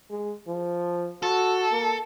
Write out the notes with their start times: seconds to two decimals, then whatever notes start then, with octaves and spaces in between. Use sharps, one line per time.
0.11 G#3
0.47 F3
1.23 F#4 A4
1.72 A#3